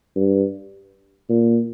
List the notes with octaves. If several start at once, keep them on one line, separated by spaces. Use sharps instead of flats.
G2
A#2